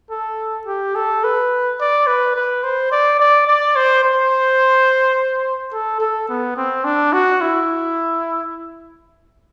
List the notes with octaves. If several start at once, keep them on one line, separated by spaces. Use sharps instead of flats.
A4
G4
A4
B4
D5
B4
B4
C5
D5
D5
D5
C5
C5
A4
A4
B3
C4
D4
F#4
E4